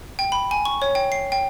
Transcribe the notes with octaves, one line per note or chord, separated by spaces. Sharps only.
G5
B5
G#5
C#6
C#5
G5
C7
G5